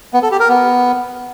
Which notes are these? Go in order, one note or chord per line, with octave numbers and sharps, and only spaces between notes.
B3
A4
G4
A#4
B3